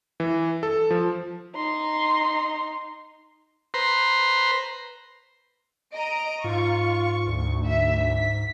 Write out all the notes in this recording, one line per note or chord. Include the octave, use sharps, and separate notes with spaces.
E3
A4
F3
D#4 C6
B4 C5 A#5 C6
D#5 A#5 D7
G#2 F4 C#6
D2
E5
B6